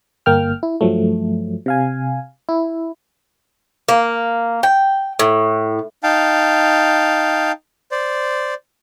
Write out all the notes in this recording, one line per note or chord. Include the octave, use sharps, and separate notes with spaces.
G1 A#3 G5 F6
E4
G2 F3 F#3 A3
C3 F5 G#5
E4
A#3
G5
A2
D#4 F5 G5 A5
C5 D5